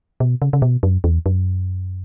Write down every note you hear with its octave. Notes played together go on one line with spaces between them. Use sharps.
B2
C#3
C#3
B2
F#2
E2
F#2